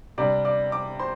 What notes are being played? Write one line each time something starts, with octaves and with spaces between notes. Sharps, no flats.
C3 G3 D4 D5 D6
D5 D6
D5 D6
C5 C6